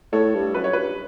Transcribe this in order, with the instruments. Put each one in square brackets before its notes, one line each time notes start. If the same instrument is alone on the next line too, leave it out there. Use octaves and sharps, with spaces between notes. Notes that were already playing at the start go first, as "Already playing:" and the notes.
[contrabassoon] A2 [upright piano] A4 C#5
[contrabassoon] G2
[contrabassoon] F#2 [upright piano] B4
[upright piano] C#5
[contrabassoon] G2 [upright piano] B4